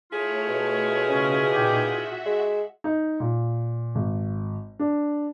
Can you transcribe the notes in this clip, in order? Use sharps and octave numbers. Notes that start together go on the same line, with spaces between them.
A3 E4 F4 G#4 C#5
B2
C#3 C#4
A#2 D#4 G4 G6
F#4 E5 F#5
G#3
D#4
A#2
G#1
D4